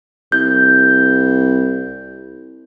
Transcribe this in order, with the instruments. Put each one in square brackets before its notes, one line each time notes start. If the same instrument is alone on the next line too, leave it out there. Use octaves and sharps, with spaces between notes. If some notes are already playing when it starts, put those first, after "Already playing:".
[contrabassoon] C2 [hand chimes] G6